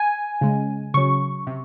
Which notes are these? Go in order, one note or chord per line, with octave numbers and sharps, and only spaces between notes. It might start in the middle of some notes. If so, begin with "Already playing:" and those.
Already playing: G#5
C#3 G#3
C#3 F#3 C#6
C3